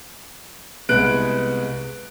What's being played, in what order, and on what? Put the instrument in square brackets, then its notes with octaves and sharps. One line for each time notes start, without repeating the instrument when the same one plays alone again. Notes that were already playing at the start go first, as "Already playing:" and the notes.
[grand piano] C2 G#3 B3 F#6 D7